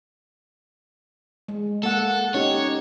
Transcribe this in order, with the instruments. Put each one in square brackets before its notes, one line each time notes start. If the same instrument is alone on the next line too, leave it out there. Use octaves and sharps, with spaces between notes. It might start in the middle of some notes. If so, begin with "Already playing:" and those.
[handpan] G#3
[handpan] A#3 F#5 [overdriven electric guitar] A4
[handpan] C#4 D#4 G4 [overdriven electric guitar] C#5